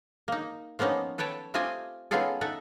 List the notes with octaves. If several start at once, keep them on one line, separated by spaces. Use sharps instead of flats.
A#3 D#4
F3 A#3 B3 C#4 D#4
A4 B4 C#5 G5 A5
A3 C4 F4 G4 D#5 G#5
B3 C#4 D#4 F4 G#4 A4
D#4 A4 E5 F#5